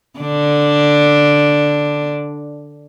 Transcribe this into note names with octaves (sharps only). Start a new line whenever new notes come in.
D3 D4